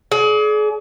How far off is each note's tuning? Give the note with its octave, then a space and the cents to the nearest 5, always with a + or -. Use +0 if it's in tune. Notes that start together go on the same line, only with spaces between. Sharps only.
G#4 +35 D5 -25